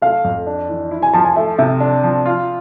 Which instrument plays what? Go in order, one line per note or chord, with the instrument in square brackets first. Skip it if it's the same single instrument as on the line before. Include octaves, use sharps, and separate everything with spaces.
[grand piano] A3 [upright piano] F5
[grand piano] F2
D4
E3
E4
[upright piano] G#5
[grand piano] F3 [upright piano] A5
[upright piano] G#5
[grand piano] A3 [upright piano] E5
[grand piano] C3 [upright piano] E5
[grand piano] D4
F3
F4